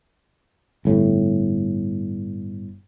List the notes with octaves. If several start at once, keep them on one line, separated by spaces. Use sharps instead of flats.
G1 A2